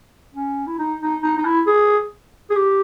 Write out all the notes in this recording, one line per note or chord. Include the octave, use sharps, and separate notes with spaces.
C#4
E4
D#4
D#4
D#4
D#4
E4
G#4
G#4
G4